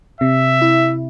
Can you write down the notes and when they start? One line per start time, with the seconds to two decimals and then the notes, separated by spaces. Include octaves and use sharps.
0.21 C3 E5
0.62 E4